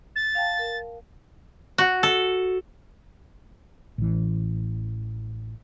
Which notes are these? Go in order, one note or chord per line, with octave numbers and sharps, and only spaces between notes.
A6
F5 G5 A5
A#4
F#4
A4
A1 E3